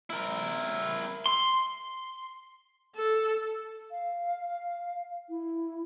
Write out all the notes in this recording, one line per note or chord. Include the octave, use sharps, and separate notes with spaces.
E4 A#4
C6
A4
F5
E4